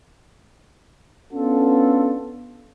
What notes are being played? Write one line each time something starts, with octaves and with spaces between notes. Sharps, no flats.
B3 C#4 D4 F4 A4